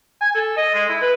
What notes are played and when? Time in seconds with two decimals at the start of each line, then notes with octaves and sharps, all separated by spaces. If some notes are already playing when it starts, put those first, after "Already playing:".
0.21 G#5
0.35 A4
0.57 D#5
0.74 G#3
0.89 E4
1.01 B4